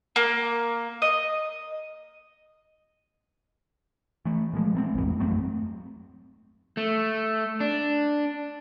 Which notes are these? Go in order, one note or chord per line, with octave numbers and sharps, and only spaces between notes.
A#3
D#5
E3 A3
A#2 F3 G#3
A3 A#3 C4
A#1 E2 G#2
F#2 F#3 A3 C4
A3
D4